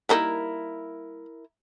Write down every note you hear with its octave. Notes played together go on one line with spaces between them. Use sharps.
G3 A#3 D#4 E4 A4 A#4